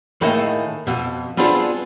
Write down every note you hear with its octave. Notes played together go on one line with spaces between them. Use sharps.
A2 D#3 A#3 G#4 D#5 E5
F2 B2
G3 B3 C4 D4 F4 G#4